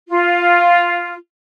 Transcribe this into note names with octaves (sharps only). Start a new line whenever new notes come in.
F4